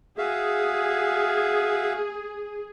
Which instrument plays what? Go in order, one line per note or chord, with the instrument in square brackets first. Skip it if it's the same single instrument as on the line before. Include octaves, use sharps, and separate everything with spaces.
[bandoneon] F#4 E5 F5 [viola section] G#4